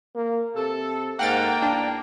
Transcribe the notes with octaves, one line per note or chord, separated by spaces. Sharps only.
A#3
C3 A4
G#2 A#3 F#5 G5 F6 A6
E2 D4